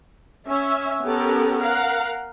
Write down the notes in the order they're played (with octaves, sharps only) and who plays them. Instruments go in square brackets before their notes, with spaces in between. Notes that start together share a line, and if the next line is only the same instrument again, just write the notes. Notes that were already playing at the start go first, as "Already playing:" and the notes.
[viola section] C#4 E5
B3 C#4 G4 A4 A#4
A#4 F5 F#5